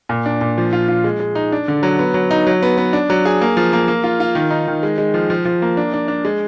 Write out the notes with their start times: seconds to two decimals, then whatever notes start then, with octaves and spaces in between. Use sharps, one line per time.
0.09 A#2
0.26 D4
0.41 A#2
0.58 F3
0.73 F4
0.88 F4
1.04 G#3
1.20 G#3
1.35 D#4
1.52 D4
1.68 D3
1.83 F#3
1.99 B3
2.14 F#3
2.31 D#4
2.47 F#3
2.63 B3
2.78 B3
2.93 D4
3.10 F#3
3.25 G#4
3.41 A#3
3.57 F3
3.73 A#3
3.88 A#3
4.04 F4
4.20 F4
4.35 D#3
4.51 D#4
4.68 D#3
4.83 G#3
4.98 G#3
5.14 F3
5.30 F3
5.45 F3
5.62 A#3
5.77 D4
5.94 D4
6.08 D4
6.25 G#3